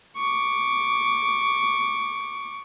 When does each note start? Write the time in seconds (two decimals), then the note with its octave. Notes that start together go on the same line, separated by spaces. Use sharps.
0.17 C#6 D6